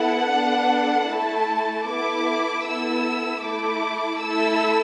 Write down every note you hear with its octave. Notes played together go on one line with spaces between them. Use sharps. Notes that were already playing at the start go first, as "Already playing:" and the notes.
Already playing: B3 E4 A4 F#5
B3 D4 A4
A3 E4 A4 A5
B3 E4 A4 D6
B3 E4 A4 E6
A3 E4 A4 D6
A3 E4 A4 E6